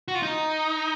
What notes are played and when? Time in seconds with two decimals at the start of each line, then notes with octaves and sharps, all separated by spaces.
0.08 F#4
0.15 F4
0.22 D#4